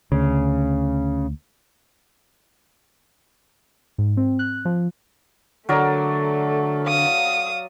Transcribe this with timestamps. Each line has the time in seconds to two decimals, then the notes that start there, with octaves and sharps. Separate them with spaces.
0.12 D2 C#3
3.98 G#2
4.17 C4
4.39 F#6
4.65 F3
5.69 D3 F#3 A3 A#4 D5
6.87 F5 D#6